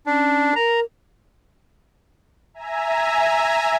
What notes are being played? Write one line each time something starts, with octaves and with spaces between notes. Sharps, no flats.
C#4 D4
A#4 A#5
E5 G#5 A#5